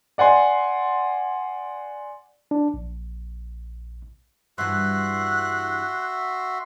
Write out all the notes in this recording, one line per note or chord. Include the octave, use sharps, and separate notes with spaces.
D5 F#5 G#5 C6
D4
A#1
G2 E3 F#4 E5 C6 F#6